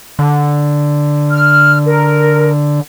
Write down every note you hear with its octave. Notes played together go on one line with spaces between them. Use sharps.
D3
F6
A#4